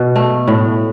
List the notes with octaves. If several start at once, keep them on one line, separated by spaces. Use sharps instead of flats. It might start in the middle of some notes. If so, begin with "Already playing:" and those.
Already playing: B2
A3
A2